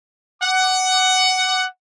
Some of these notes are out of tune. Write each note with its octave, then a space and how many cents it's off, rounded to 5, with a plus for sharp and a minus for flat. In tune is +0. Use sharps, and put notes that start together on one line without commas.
F#5 +15 D6 +5